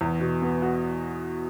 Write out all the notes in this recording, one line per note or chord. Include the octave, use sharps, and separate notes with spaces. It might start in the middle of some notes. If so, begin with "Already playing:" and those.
E2
B2
B3
F#4